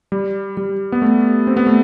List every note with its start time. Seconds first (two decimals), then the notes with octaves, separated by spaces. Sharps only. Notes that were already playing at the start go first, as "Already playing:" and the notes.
0.12 G3
0.57 G3
0.92 B3
1.02 A3
1.47 C4
1.57 B3
1.67 A3